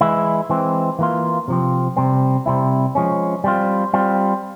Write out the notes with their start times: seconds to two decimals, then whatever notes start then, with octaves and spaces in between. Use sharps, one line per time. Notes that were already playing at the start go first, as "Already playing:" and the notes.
0.01 E3 G#3 E4
0.50 E3 G#3 C4
0.99 E3 A#3 F4
1.48 C3 F3 C4
1.97 C3 G3 C4
2.46 C3 G3 C4 E4
2.95 F3 G#3 C#4
3.44 G3 C4 F4
3.94 G3 C4 F4